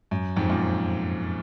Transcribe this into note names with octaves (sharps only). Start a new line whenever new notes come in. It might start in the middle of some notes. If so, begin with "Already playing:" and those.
F#2
F2 G#2
F#2 A#2